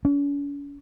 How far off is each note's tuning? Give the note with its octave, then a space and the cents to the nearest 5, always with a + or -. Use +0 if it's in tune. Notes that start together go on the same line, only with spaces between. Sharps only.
C#4 +45